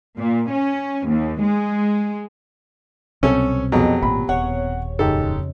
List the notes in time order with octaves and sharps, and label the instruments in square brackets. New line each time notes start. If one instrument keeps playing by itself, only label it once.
[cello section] A#2
C#4
D#2
G#3
[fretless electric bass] C2 [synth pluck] B2 F#3 C4 [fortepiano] C#4 A4 C#5
[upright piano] F2 B2 [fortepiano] F#3 [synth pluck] B3 G4 G#4
[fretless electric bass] G#1 A#2 [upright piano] B5
[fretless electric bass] D#1 [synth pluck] C#5 [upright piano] F#5
[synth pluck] F2 C#3 [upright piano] G#2 [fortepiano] G4 A4